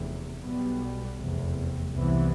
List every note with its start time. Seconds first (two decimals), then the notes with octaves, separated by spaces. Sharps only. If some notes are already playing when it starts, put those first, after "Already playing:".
Already playing: F1 E2 C3
0.43 B1 B2 G3 B3
1.18 F1 E2 C3
1.93 C2 C3 E3 B3